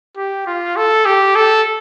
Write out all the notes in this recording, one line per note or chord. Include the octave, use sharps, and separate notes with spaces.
G4
F4
A4
G4
A4